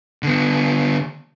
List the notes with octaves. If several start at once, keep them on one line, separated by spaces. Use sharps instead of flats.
D3 B3